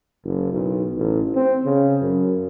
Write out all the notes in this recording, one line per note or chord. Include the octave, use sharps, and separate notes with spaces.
F#1
B1
A1
C4
C#3
F#2